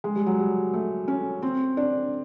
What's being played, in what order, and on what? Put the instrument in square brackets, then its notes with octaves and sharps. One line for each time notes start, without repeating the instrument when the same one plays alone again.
[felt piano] G#3
G3
F#3
G3
A3
C#4
C4
D4